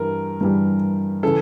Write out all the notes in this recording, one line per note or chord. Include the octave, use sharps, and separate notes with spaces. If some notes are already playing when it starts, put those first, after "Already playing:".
Already playing: G2 E3 G3 A#4
G2 E3 G3
C#3 E3 A4